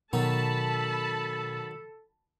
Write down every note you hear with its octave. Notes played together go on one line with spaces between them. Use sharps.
B2 D#3 F#3 A4 A5 B5